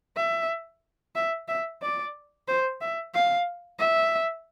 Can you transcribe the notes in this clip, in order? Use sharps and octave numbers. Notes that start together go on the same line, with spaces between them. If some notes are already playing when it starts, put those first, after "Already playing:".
E5
E5
E5
D5
C5
E5
F5
E5